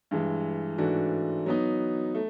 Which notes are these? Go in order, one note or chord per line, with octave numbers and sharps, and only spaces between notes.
G2 E3 G#3
G#2 E3 A3 D4 F#4
F#3 B3 D#4
A3